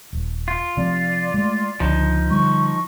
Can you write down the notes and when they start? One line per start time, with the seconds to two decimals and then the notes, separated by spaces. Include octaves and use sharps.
0.13 D#1
0.48 F4
0.77 C3 F3 C4 D5
1.34 G#3 A3
1.80 C#2 D3 F3 D4 D#4
2.31 D3 G3 C#6